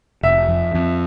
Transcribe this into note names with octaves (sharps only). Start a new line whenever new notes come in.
F1 E5
F2
F2